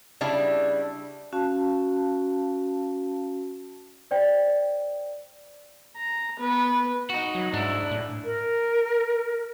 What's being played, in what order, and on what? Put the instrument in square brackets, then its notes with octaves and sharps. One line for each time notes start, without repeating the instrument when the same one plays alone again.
[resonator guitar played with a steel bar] C#3 G3 D4 E4
[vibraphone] C#4 F#4 F5 A5
[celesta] C5 D5 G5
[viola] A#5
B3 B4
[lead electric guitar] D#4 F#4
[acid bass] F#3
[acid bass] G#2 [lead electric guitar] D4 E4
[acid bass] A2
[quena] A#4